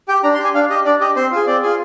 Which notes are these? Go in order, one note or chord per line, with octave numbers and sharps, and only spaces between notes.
G4 G5
D4 A#5
C6
G4
G#5
D4 F5
G4 D#5
D4 D5
G4 D#5
C4 C5
F4 G#4
C4 D5
F4 G#4